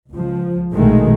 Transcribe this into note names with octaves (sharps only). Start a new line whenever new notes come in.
C#2 F3
A#1 B2 D#3 G#3 A3